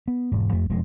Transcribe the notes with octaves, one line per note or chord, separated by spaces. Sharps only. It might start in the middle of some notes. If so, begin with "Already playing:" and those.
B3
E1 G#2
F2 A3
E1 F2 F3 G#3